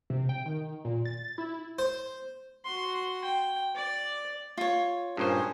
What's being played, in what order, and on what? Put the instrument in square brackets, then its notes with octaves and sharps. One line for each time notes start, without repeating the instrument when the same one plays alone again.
[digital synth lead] C3
G5
D#3
A#2
A6
E4
[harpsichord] C5
[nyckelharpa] F#4 C6
G5
D5
[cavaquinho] F4 C#5
[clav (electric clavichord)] G2 A#2 C5 [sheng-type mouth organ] C#4 G#4